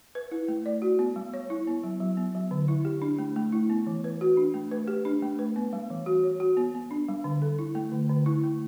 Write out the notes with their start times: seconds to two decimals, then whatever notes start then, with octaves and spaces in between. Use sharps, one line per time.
0.15 B4
0.32 E4
0.48 A3
0.66 D5
0.82 F#4
0.99 B3
1.16 G3
1.34 C#5
1.50 E4
1.67 B3
1.84 F#3
2.00 F#3
2.17 B3
2.35 F#3
2.51 D3
2.68 E4
2.85 G4
3.02 D4
3.18 A3
3.36 A3
3.52 E4
3.70 B3
3.87 E3
4.04 B4
4.21 F#4
4.37 D4
4.54 A3
4.71 B4
4.88 G4
5.05 D4
5.22 A3
5.39 B4
5.56 B3
5.73 G3
5.90 E3
6.06 F#4
6.24 C#5
6.40 F#4
6.57 B3
6.75 B3
6.91 D4
7.08 G3
7.24 D3
7.42 A4
7.59 E4
7.75 A3
7.92 D3
8.09 D3
8.26 E4
8.44 A3